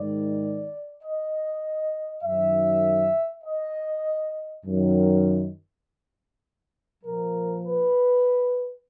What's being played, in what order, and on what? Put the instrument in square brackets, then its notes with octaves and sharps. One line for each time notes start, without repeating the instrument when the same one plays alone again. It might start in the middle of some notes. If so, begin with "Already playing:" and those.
Already playing: [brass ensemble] G#2 D#3 D5
D#5
F#2 D#3 E5
D#5
F#2 D#3
A#2 F3 A#4
B4